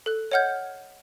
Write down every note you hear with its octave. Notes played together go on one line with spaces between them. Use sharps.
A4 F#6
C#5 D#5 F#5 F6 G6 G#6